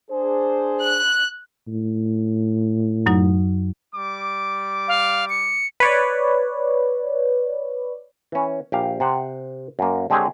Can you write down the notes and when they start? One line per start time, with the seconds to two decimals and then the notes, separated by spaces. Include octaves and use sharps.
0.11 D4 G#4 C5
0.81 F#6
1.67 A2
3.06 F#2 F#3 D#4
3.94 G3 D6
4.88 F5
5.30 C#7
5.80 B4 C#5 D5
8.32 E3 C#4
8.72 A#1 G4 F5
9.00 C3 C5 F#5
9.79 F#2 A#3
10.10 D3 G#3 C4 G4 G#4 C#5